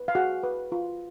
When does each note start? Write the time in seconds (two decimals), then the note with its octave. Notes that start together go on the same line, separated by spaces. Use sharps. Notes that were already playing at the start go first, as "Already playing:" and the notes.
Already playing: B4
0.08 F5
0.15 F#4 G#4 F#5
0.43 B4
0.72 F4